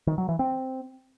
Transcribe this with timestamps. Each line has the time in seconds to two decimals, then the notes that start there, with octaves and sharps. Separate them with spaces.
0.07 D#3
0.18 F#3
0.29 E3
0.39 C4